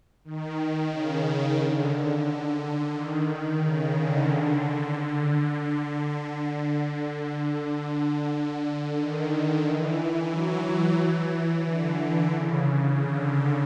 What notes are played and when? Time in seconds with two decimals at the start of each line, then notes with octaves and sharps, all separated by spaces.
0.24 D#3
0.91 C#3
1.59 D3
2.92 D#3
3.60 C#3
3.94 D3
4.27 D3
4.95 D3
7.62 D3
8.96 D#3
9.63 E3
10.30 F#3
10.64 F#3
10.98 E3
11.64 D3
12.32 C#3
12.99 D3